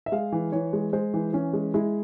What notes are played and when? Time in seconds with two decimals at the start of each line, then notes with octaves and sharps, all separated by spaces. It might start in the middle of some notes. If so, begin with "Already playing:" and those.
0.06 E5
0.12 G#3 F5
0.32 E3
0.52 E3 C#5
0.73 G#3
0.93 G#3 C5
1.14 E3
1.33 E3 C#4
1.53 G#3
1.74 G#3 E4